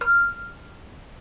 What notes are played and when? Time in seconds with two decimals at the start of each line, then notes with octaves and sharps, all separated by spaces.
0.01 F6